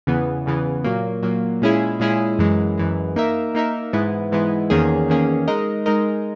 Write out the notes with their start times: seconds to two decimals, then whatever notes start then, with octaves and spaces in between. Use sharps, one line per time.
0.07 E2 C#3 E3 B3
0.46 E2 C#3 E3 B3
0.84 A#2 F#3 A#3
1.23 A#2 F#3 A#3
1.62 A#2 G#3 C#4 E4 G#4
2.00 A#2 G#3 C#4 E4 G#4
2.39 F#2 E3 G#3
2.78 F#2 E3 G#3
3.16 A#3 D#4 A#4 E5
3.55 A#3 D#4 A#4 E5
3.93 G#2 E3 G#3 B3 E4
4.32 G#2 E3 G#3 B3 E4
4.70 E2 D#3 A#3 C#4 G#4
5.08 E2 D#3 A#3 C#4 G#4
5.48 G#3 D#4 A#4 D#5
5.86 G#3 D#4 A#4 D#5